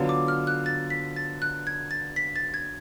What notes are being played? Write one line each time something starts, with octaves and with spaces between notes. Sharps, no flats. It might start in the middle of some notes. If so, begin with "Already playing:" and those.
Already playing: D3 F#3 B3 F4
D6
F6
F#6
A6
B6
A6
F#6
G#6
A6
B6
A6
G#6